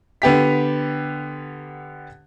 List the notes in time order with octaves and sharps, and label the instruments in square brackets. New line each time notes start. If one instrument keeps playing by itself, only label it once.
[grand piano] D3 B3 G4 B6